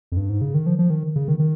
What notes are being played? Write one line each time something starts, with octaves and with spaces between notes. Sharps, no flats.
F2
G2
G#2
C#3
D#3
F3
F3
D#3
C#3
D#3
D#3